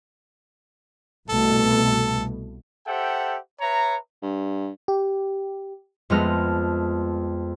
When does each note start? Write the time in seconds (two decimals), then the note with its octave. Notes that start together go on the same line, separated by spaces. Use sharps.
1.30 C2 B2 A3 A4
2.87 G4 A4 C5 E5 F#5 G5
3.61 B4 C#5 E5 A#5
4.22 G2
4.88 G4
6.10 F2 G#3 A3 B3 F6 A#6